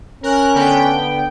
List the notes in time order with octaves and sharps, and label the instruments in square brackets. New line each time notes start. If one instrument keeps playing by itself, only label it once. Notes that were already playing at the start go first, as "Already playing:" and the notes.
[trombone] C#4 [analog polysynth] A#4 F#6
[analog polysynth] D3 B3 G5